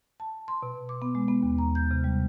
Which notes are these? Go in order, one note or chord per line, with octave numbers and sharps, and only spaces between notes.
A5
C6
B2
D6
B3
G#3
B3
D#2
A#5
G6
C3
G3